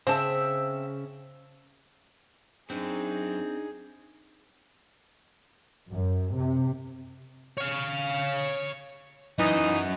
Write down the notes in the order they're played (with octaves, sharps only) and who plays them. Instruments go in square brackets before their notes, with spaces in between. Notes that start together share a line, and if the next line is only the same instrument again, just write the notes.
[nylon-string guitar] C#3 [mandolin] C4 E5 [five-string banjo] C5 A5
[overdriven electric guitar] F#2 [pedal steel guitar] C4 [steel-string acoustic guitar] D4 D#4 [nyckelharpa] G#4
[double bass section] F#2
C3
[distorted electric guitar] C#5 F5
[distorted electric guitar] F#2 [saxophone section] E3 D#4 D#5